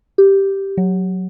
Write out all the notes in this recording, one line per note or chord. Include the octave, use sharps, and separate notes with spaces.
G4
F#3